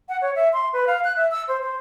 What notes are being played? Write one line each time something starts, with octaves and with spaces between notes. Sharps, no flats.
F#5
C#5
E5
C6
B4
F5
F#6
E5
E6
C5
C5